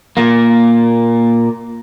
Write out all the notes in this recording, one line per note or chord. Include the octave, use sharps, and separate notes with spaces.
A#2 A#3